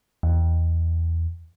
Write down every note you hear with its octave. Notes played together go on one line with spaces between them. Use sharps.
E2